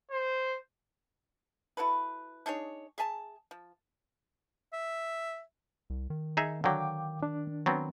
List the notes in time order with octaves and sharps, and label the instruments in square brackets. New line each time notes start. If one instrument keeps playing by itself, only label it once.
[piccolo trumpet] C5
[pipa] E4 F#4 A4 B4
D4 D#4 G#4 C#5
G#4 E5 G#5 A5
F3
[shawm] E5
[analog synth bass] C2
D#3
[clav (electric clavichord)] D#4 G#4 E5
[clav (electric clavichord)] D3 F#3 [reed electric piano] F5 G5 D6
[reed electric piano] D4
[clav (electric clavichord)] F#3 B3 C4